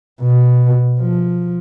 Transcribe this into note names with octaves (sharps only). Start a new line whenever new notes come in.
B2
F3